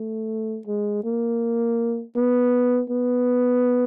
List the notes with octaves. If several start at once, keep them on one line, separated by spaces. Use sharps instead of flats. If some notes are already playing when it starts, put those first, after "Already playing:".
Already playing: A3
G#3
A#3
B3
B3